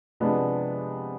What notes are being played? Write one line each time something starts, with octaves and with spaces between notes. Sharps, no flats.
C3 F3 G#3 B3 D4